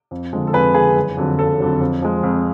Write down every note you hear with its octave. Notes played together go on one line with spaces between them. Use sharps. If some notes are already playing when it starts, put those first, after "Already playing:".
F2
D3 F3 G#3
A4
F2 G#4 B4
D3 F3 G#3 G#4
F#1
F2 D3 F#3
F#1 A4
F2 D3 F#3
F2
F3 G#3
F2